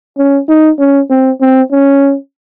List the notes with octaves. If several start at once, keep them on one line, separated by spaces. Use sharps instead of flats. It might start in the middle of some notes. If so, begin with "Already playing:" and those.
C#4
D#4
C#4
C4
C4
C#4